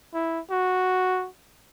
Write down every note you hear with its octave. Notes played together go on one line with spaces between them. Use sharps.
E4
F#4